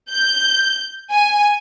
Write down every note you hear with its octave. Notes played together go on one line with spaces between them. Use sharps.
G6
G#5